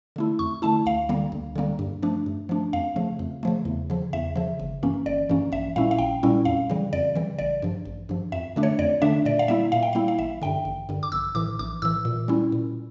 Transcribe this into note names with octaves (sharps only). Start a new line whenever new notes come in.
D3 A3 E4
F2 C#6
D3 A3 E4 A5
D2 F5
D3 G3 A#3
D2
D3 G3 A#3
G2
F3 A3 D4
G2
F3 A3 D4
F2 F5
C#3 F3 A3
F2
C#3 F3 A3
E2
C#3 F3
E2 E5
C#3 F3
G1
G2 E3 A#3 C#4
G1 D5
G2 E3 A#3 C#4
A#1 E5
A#2 G3 C#4 E4 F5
F5
A#1 G5
A#2 G3 C#4 E4
F2 F5
C#3 E3 G3
F2 D5
C#3 E3 G3
A1 D5
G2 F3
A1
G2 F3
F2 E5
D3 A3 D4
C#5
F2 D5
D3 A3 D4 E5
A#2 D5
F5
G3 A#3 E4 E5
A#2 F5
G5
G3 A#3 E4 F5
F5
A1 E5
G2 D3 G5
A1
G2 D3
D6
A#1 E6
A2 E3 D6
A#1 D6
A2 E3 E6
A#2
G3 C#4 E4
A#2